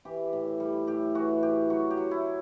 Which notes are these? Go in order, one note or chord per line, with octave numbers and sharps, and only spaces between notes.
E3 G4
A2
G3
A2 G4
E3 F#4
A2 G4
F#3 F#4
G4
F#3
E4